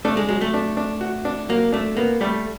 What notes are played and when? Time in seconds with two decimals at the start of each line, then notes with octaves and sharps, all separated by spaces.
0.05 A3 D4
0.17 G#3
0.29 F#3 G#3
0.41 A3
0.54 D4
0.77 D4
1.01 F#4
1.25 D4
1.49 F#3 A#3
1.72 A3 D4
1.97 A#3 B3
2.21 G3 A3